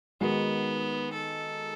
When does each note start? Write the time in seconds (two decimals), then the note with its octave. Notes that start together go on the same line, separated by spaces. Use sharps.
0.21 D#3 G#3 B3 D#4 F#4
1.13 A4